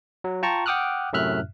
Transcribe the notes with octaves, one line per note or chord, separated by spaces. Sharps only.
F#3
F4 G5 A5 A#5 C#6
F#5 G5 D6 D#6 F6 F#6
F#2 A2 C3 E5 F6 F#6